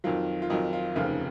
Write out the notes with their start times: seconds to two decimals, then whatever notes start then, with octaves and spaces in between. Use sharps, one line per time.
0.04 F2 D#3 F#3 F4
0.42 F4
0.50 F2 D#3 F#3 D#4
0.73 F4
0.95 F1 D#2 C#3 F3 F4